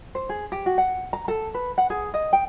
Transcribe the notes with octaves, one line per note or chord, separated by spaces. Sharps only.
C5
G#4
G4
F#4
F#5
A#5
A4
B4
F#5
G#4
D#5
G5